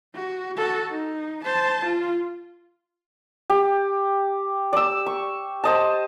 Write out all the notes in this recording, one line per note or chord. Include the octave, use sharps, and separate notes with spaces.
F#4
F#4 A4
D#4
C5 A5
F4
G4
D5 E6
C#6
C5 D#5 A5